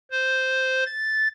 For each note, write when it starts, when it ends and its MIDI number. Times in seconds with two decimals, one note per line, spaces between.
0.11 0.84 72
0.86 1.28 93